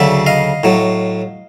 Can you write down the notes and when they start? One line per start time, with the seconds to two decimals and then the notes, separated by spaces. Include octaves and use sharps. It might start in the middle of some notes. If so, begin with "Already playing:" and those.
Already playing: D2 C#3 F#3 D5 E5
0.26 D#5 F5
0.64 A2 F#3